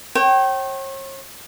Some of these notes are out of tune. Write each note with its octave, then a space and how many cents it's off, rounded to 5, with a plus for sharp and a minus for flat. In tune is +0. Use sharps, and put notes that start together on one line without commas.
C#5 -40 G5 -30